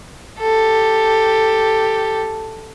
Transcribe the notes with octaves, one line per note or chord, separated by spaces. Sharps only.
G4 A4